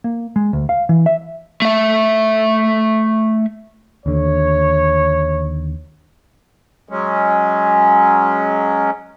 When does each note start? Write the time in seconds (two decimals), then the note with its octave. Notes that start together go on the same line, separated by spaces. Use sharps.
0.04 A#3
0.36 G#3
0.53 D2
0.69 F5
0.89 E3
1.06 E5
1.62 A3 E5
4.06 D#2 D3 C#5
6.89 F#3 G#3 C#4